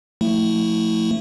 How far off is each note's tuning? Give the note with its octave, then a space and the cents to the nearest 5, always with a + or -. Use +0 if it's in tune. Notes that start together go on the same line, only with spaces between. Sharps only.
F3 +15 A3 +15 E4 -15